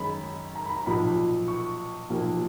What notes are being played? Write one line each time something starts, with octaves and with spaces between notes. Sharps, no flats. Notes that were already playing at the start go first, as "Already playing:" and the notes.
Already playing: G#1 F#2 D#3 G#3 C#4 B5
A#5
B5
A#5
B1 A#2 F3 B5
C#6
B1 A#2 F3 A#3